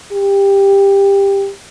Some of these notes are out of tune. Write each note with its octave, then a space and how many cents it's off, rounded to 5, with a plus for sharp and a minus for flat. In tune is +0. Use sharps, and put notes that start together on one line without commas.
G4 +15